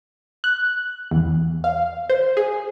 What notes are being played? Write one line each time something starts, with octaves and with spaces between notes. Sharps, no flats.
F#6
E2
F5
C5
G#4